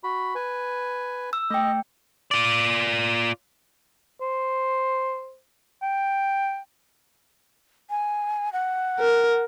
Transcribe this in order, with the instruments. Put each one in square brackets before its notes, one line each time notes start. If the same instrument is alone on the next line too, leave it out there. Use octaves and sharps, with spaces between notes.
[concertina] F#4 B5
B4 G#5
[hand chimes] E6
[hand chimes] A3 G5 [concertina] D#5
[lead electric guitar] F4 D5
[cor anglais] C5
G5
[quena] G#5
F#5
[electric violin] A#4